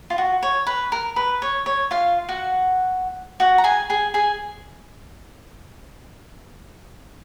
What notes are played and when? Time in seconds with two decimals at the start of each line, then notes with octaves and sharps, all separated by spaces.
0.10 F4
0.18 F#4
0.43 C#5
0.67 B4
0.92 A#4
1.16 B4
1.42 C#5
1.66 C#5
1.91 F4 F5
2.29 F#4 F#5
3.40 F#4 F#5
3.58 A#5
3.64 G#4 G#5
3.90 G#4 G#5
4.14 G#4 G#5